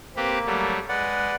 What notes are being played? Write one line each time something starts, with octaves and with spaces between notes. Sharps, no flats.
A#3 C4 G4 B4
F#3 G3 A3
G#3 B4 D5 F#5